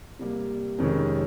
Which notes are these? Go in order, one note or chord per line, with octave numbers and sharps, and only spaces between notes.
C3 G3 A#3
F2 C3 D#3 G#3 C#4